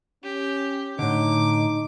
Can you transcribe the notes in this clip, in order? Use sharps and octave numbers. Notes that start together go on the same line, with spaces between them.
C#4 G4
A2 D3 D#4 D6